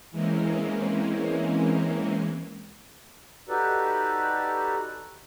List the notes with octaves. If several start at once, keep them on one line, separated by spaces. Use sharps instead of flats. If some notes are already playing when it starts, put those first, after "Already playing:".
E3 G#3 A#3 C4 C#4
D#4 F#4 G4 A4 B4 D5